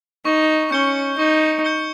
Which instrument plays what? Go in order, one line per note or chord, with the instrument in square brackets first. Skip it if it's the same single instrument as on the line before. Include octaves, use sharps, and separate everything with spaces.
[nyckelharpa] D#4 [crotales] C#6
[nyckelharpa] C#4 [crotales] G6 C#7 G7
[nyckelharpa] D#4 [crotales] C#6
[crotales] G6 C#7 G7